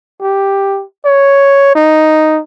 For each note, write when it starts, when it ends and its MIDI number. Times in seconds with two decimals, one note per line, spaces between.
0.22 0.83 67
1.05 1.75 73
1.75 2.41 63